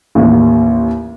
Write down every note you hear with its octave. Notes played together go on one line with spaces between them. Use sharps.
A1 D#2